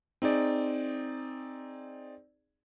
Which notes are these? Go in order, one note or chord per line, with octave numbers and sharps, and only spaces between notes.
C4 D#4 G#4 D5